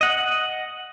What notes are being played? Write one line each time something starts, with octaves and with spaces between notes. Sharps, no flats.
D#5 F#5